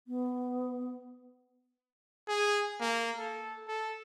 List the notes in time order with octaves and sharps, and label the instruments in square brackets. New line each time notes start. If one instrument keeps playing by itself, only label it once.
[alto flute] B3
[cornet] G#4
A#3
A4
A4